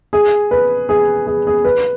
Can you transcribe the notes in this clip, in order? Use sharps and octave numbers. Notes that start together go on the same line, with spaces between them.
G#4
B4
G#4
G#4
G#4
B4